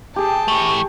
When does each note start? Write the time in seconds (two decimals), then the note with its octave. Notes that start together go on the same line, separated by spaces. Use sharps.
0.16 G4 G#4 G5 A5
0.48 E3 A3 C#6